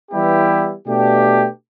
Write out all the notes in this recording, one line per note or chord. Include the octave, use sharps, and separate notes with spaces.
E3 G3 B3 E4 G4
B2 A3 D4 G4